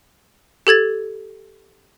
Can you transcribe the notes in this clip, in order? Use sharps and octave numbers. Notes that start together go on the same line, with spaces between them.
G4 A4 G#6 A6